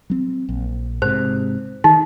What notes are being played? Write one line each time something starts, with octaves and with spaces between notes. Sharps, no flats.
F#3 C4
A#1
G#2 C3 C5
D#3 D#4